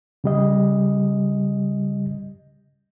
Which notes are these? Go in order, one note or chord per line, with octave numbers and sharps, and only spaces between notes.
C#3 G3 D#5